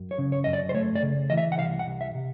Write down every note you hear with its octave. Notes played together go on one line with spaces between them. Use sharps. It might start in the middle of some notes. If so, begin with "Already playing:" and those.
Already playing: F#2
C#5
C#3
C#5
F#2 D#5
D5
C5
A3 C#5
D5
C#3
E3 D#5
E5
F#5
C2 F5
F#5
C2
E5
C3